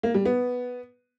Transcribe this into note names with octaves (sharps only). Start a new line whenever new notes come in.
A#3
G3
B3